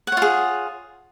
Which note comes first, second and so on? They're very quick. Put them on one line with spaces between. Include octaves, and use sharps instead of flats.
F#5 C#5 F4 G#4